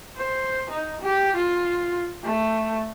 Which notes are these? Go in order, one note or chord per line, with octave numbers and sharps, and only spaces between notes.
C5
D#4
G4
F4
A3